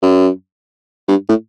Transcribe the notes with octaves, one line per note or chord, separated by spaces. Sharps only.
F#2
G2
A2